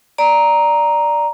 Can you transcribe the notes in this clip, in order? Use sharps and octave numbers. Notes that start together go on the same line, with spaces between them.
D5 A#5